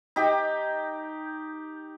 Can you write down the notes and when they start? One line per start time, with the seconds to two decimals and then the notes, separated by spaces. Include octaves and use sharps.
0.16 D#4 G4